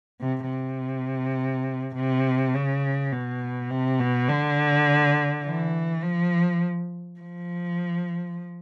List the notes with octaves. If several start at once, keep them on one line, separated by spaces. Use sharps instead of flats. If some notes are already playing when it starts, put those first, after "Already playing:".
C3
C3
C3
C#3
B2
C3
B2
D3
E3
F3
F3